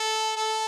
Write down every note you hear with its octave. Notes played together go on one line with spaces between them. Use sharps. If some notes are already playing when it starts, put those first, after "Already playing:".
Already playing: A4
A4